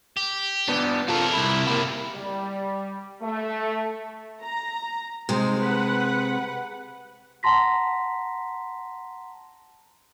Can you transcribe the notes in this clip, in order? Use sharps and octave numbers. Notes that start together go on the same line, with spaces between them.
G4
B3 D4
C3 F4 A4 A#4
C2 E4
A#3 E4
G3
A3
A#5
C3 G#3 D#4
B4 F#5
F#5 A5 A#5 C6 A#6 B6